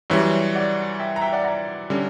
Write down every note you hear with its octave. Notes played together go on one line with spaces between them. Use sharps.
F#2 E3 G3 C#5 E5
D5 F#5
E5 G5
A#5
E5 G5
D5 F#5
F#5 A#5
D3 G3 C#4